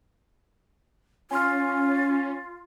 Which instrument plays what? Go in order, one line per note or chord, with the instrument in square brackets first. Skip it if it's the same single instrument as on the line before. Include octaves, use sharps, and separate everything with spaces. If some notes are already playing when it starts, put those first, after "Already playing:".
[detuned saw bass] C#4 [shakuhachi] F4 [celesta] G#5 C6 F6